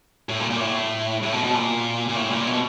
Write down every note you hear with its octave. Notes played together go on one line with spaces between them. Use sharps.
A2
A#2
A#2
A2
A2
B2
B2
A#2
A#2
A2
A#2
B2